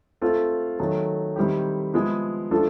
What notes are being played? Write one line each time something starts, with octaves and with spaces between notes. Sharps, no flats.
A3 C4 F4 A4
D#3 F#3 A3
D#3 G3 C4 E4 G4
F3 G#3 B3 E4
F3 A3 D4 F4 A4